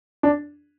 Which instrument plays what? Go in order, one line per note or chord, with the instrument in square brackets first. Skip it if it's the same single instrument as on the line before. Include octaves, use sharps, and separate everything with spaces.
[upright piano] D4